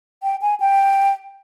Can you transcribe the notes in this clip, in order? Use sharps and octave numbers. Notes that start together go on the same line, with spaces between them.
G5
G#5
G5